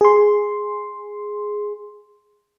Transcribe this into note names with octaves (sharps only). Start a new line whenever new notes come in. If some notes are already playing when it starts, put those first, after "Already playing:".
G#4 C6